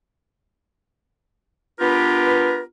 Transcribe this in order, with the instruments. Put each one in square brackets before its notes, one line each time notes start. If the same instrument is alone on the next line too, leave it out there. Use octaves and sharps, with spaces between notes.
[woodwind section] B3 D4 F4 G4 A#4 B4